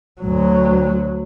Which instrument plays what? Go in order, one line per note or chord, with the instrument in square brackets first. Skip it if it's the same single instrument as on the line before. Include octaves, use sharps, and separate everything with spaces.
[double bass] D2 F#3